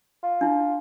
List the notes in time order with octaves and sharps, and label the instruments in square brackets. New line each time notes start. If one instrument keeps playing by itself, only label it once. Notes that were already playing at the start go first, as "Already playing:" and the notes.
[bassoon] F4
[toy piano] D4 E4